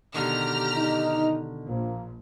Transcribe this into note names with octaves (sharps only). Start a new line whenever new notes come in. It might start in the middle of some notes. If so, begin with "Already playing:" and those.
B2 D3 D#3 G4 A#5 F6
D#4
A#1 F3 A#3